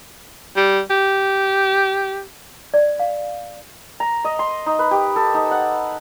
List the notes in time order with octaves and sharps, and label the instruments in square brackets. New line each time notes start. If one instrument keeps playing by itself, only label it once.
[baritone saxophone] G3
G4
[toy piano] D5
F5
[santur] A#5
D#5
C6
D#4
B4
G4
A4
D#4
F#5